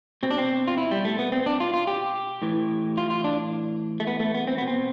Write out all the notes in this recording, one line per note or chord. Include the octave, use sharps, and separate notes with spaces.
B2 C4
D4
C4
F4
E4
G3
A3
B3
C4
D4
F4
F4
G4
A2 E3
F4
F4
D4
A3
B3
A3
B3
C4
B2 B3
C4